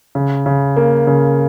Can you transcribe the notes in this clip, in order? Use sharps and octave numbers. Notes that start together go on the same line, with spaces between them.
C#3
C#3
A#3
C#3